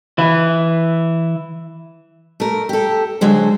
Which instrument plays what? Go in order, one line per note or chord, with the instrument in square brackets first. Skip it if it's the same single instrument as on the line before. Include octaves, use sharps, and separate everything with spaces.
[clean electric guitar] E3 E4
[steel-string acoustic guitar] A3 A#4
G4 A4
D3 F#3 G#3 C5